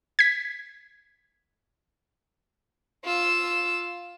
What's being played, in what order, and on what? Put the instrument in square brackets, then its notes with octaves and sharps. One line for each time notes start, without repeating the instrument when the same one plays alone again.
[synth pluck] G#6 B6
[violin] F4 E6